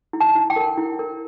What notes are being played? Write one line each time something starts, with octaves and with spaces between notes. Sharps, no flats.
E4
A5
E4
G5
A#4
E4
A#4